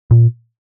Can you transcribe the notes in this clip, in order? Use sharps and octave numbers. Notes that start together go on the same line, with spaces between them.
A#2